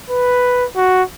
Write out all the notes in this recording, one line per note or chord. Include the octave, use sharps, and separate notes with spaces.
B4
F#4